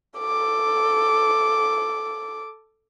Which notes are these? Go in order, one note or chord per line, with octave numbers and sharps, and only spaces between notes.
A4 D6